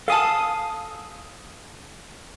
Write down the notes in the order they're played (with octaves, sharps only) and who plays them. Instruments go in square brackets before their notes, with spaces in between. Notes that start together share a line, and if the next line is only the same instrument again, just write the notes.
[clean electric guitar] A4 G#5 A5 [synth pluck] F5 D#6 D#7